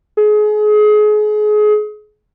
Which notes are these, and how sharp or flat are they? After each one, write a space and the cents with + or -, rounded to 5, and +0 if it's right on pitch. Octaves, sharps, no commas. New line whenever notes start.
G#4 +30